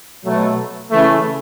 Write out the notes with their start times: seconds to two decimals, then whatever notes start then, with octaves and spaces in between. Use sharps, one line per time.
0.24 B2 F#3 A3
0.91 C#3 E3 A3